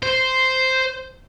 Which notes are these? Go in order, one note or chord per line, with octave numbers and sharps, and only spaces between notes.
C5